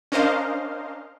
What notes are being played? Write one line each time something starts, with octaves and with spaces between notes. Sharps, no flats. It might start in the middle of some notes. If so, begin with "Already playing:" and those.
C#4 D4 A#4 C5 D#5 F5